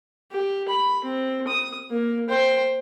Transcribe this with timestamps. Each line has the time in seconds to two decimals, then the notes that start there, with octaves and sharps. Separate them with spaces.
0.32 G4
0.69 B5
1.04 C4
1.48 D#6
1.90 A#3
2.29 C5 G5